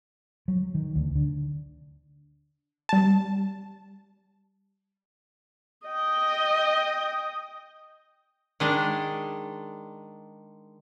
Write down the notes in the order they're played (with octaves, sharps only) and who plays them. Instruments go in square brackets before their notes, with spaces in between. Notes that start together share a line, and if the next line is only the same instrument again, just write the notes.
[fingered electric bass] F#3
D#3
D2
D3
[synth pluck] G3 A5
[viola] D#5 G5
[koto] D#3 G#3 D4